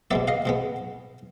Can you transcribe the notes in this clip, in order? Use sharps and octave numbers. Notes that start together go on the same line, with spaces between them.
B2 G#3 B3 D5 E5
D#5 F5
B2 G#3 B3